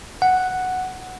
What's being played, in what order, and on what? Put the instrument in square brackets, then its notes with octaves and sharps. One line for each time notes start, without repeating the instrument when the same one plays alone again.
[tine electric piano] F#5